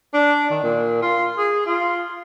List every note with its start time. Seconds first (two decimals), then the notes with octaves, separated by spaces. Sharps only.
0.14 D4
0.50 D#3
0.63 A#2
1.02 F4
1.38 G#4
1.66 F4